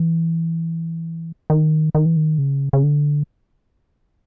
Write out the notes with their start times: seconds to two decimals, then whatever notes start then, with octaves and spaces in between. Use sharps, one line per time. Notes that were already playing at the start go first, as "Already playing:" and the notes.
Already playing: E3
1.50 D#3
1.95 D#3
2.05 E3
2.16 D#3
2.38 C#3
2.73 C#3
2.83 D3